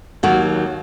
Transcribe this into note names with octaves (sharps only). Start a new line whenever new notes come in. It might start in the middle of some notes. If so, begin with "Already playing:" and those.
D#2 D#3 F#3 F#4